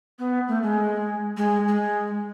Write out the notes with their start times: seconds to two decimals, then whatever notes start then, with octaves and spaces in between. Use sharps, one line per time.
0.19 B3
0.48 A3
0.63 G#3
1.37 G#3
1.68 G#3